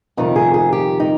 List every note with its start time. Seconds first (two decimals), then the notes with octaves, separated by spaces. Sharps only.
0.17 F2 C3 D#3 G3 D#4
0.36 G#4
0.54 G#4
0.72 G4
1.00 D#4